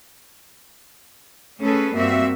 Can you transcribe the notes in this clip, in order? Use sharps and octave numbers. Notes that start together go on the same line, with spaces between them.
A3 C#4 G#4 A4 B4
G2 A#3 C4 F#4 E5